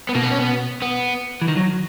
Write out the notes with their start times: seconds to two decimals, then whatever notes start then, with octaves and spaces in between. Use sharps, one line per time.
0.09 B3
0.15 B2 A#3
0.23 B3
0.31 C#4
0.40 B3
0.82 B3
1.42 E3
1.48 D#3
1.57 F#3